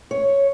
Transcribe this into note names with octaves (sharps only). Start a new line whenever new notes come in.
C#5